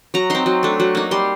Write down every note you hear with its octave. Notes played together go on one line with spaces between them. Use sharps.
F#3 A#5
C4 D#4 C6
F#3
A3 D4
F#3
A#3 D#4
G3 C6